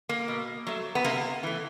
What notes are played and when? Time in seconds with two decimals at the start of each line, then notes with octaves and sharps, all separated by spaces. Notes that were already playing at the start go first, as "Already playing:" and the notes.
0.09 A#3
0.28 B2
0.67 F#3 A3
0.95 B3
1.04 C3 A#3
1.43 E3 A3